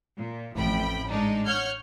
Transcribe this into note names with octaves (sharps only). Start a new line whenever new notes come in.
A#2
A1 F2 A2 G5 B5
G#2 G#3 D4 D#4
C#5 F#5 F6 G6 G#6